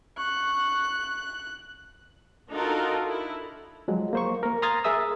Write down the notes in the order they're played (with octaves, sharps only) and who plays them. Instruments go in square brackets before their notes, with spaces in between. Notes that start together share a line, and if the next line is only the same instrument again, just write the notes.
[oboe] C#6 [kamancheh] F#6
[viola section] D4 D#4 F4 F#4 A4 A#4
E4
[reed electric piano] F3 F#3 G#3
A#3 C5 C#6
A#3 A#4
A#5 C6 D#6 F6 G#6 A6
G#4 A#4 E5 D#6 E6